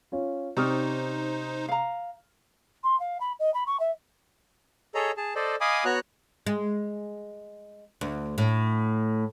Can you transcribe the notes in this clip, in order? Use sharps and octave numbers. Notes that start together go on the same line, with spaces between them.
C#4 F4
C3 C#4 D#4 C5 D5 D#6 F6
F5 A#5
C6
F5
B5
D#5
B5
C#6
E5
G#4 A4 C#5 D#5 A#5
G#4 A5
A4 C5 D5 D#5
D#5 F5 G#5 B5 D6 D#6
B3 F#4 C#5 A#5 F#6
G#3
D2
A2